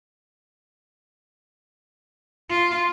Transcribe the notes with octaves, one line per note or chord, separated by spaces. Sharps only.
F4